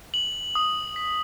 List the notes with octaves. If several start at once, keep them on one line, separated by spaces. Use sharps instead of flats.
F#7
D#6
B6